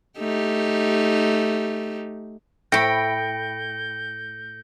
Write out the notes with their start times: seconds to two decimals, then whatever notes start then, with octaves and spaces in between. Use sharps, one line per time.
0.18 A3 D#4 G4
2.72 A2 G5 B5 G6 A#6 C#7 D7